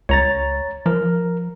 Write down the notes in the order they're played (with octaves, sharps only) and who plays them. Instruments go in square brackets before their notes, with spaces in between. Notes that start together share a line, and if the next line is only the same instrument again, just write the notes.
[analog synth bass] C#2 [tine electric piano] C#5 A#5 A6
[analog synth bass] F3 [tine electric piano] A#4